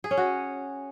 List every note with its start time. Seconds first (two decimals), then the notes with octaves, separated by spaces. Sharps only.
0.04 G#4
0.11 C#4
0.17 F#4